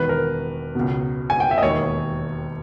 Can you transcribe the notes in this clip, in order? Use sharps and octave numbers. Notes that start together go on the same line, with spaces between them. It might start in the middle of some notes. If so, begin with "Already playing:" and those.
Already playing: E1 E2 D#3 B4
A#4
C#2 B2
G#5
G5
E5
D#5
E1 D#2 D#3 C#5